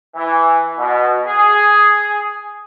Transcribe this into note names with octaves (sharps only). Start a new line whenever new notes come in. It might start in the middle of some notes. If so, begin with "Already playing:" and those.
E3
B2
G#4